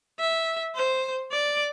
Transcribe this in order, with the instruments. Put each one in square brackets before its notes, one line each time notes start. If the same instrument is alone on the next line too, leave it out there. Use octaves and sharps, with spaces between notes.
[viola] E5
C5
D5